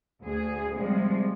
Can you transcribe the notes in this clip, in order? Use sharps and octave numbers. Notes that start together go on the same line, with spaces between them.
D2 G#4
C3 F3 G3 G#3